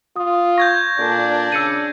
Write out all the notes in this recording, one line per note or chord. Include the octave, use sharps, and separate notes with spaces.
F4 D#6
C#6 G6 G#6 A#6
A#2 D4 A4
C#3 E6 C#7 D#7